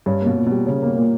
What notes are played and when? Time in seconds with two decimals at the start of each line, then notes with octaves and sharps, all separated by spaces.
0.06 G2 C#4
0.21 B2 A#3
0.36 A#2
0.46 B2 G3
0.66 C#3 C#4
0.82 B2 A#3
0.96 A#2